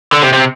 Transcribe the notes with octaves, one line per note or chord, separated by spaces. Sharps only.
D3
C3
C3